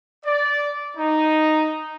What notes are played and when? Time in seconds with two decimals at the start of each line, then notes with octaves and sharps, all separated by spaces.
0.24 D5
0.96 D#4